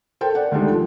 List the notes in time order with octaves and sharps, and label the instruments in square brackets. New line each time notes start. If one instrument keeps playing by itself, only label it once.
[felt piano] A4 A#4 C5 G5
D5 F#5
D2 D3 D#3 G3 G#3
F3